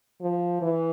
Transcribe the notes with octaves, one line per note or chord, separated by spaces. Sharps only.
F3
E3